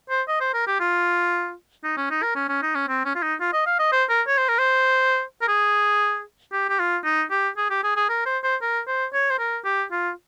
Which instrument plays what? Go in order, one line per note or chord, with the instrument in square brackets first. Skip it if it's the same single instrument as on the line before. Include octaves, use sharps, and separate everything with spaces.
[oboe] C5
D#5
C5
A#4
G4
F4
D#4
C#4
D#4
A#4
C#4
C#4
D#4
C#4
C4
C#4
F4
D#4
F4
D#5
F5
D#5
C5
A#4
C#5
C5
A#4
C5
A#4
G#4
G4
G4
F4
D#4
G4
G#4
G4
G#4
G#4
A#4
C5
C5
A#4
C5
C#5
C5
A#4
G4
F4